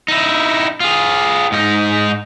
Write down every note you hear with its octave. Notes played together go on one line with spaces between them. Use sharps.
D#4 E4
F4 G#4
G#2 D#4